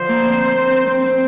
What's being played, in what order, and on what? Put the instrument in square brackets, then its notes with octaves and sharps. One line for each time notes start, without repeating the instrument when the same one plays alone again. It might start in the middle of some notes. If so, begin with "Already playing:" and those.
Already playing: [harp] D3 F3 [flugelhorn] C5
[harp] A#3
C4
C4
[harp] C4 [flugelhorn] C5
[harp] C4